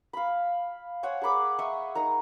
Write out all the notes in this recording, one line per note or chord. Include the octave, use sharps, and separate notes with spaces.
F5 B5
C5 C#5 F#5 G#5
G#4 A#4 B5 D6
D#5 E5 C#6 D#6
D#4 A#4 A#5